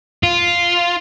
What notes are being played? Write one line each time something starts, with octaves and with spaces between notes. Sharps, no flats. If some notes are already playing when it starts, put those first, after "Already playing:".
F4